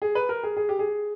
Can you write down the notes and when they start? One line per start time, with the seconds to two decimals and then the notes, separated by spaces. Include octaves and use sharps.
0.02 G#4
0.15 B4
0.29 A#4
0.43 G#4
0.57 G#4
0.69 G4
0.79 G#4